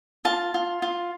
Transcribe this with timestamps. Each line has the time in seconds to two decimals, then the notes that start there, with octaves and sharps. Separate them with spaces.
0.25 F4 A5
0.54 F4
0.82 F4